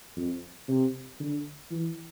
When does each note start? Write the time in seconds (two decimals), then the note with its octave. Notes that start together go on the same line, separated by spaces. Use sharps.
0.17 F2
0.68 C3
1.20 D3
1.71 E3